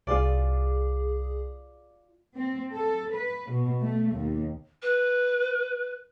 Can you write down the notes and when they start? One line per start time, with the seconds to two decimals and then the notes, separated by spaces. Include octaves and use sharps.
0.07 C2 F4 G#4 D5
2.37 C4
2.73 A4
3.14 B4
3.50 B2
3.82 A3
4.14 D#2
4.82 B4